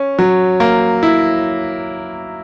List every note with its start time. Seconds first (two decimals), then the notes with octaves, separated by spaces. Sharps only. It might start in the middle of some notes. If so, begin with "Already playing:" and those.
Already playing: C#4
0.19 F#3
0.60 A#3
1.03 E4